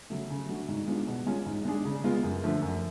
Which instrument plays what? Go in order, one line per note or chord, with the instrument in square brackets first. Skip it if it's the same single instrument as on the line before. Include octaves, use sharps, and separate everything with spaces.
[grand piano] C#3 F#3 A3
C#3
F#3 A3 D4 F#4
G#2
G#3 B3 D4 F4
B2
G#3 C#4 F4
G#2
G#3 D4 G#4
C#3
G#3 B3 F4
F#2
D3 F3 A3
F#2